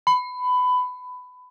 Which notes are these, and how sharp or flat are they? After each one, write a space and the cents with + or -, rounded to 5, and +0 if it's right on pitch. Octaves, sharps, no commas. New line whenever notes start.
B5 +20